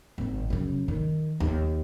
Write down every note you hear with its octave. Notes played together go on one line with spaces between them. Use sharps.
G#1 G#2
F#2 C#3
D#3
D#2